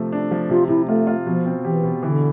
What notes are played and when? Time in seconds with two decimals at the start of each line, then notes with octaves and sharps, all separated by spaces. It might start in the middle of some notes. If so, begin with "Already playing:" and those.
Already playing: C3 F3 A3
0.12 D4
0.31 F3
0.50 C3 F4
0.69 C3 E4
0.88 A3 F4
1.07 F4
1.26 B2 F3
1.46 C4
1.64 E3 G4
1.83 B2
2.02 D3 E3